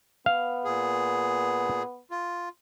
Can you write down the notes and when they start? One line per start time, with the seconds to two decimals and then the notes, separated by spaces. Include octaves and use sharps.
0.26 B3 F5
0.65 A#2 G#4
2.11 F4